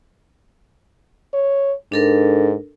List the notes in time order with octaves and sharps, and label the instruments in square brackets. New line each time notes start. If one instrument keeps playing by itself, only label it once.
[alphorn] C#5
[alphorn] G#2 [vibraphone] D4 A4 A#4